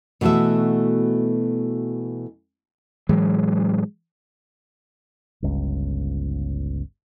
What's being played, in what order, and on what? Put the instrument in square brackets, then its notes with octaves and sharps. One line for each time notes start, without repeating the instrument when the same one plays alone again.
[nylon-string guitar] B2 E3 A3 F#4 E5
[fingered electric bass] A2 E3 F#3 G#3
G1 C#2